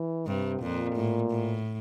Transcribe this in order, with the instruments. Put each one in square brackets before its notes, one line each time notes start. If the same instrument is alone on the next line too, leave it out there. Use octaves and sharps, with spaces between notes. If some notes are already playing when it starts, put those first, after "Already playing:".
Already playing: [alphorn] E3
[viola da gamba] G2 [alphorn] C3
[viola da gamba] F2 [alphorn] A#2
[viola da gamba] A2
A2